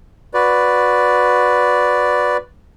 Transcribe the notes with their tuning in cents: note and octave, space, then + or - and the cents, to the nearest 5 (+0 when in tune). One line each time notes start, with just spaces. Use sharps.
F#4 -20 B4 +0 D5 -5